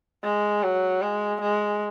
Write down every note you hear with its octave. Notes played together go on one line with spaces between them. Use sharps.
G#3
F#3
G#3
G#3